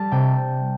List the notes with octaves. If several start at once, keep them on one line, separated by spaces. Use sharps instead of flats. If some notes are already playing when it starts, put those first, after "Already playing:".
Already playing: G3 A5
C3 G5